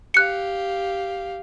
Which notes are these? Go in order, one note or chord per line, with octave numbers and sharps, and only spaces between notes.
G4 F5 F#6 C#7